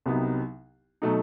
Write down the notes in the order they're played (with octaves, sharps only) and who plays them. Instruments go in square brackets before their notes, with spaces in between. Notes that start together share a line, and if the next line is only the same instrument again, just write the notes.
[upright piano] C2 C3 F#3 B3 D#4
B2 F#3 A3 D#4